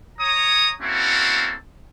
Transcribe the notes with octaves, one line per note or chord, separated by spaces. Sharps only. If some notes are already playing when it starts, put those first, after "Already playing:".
C#5 A#5 D#6
A#3 C4 C#4 E4 F#4 A4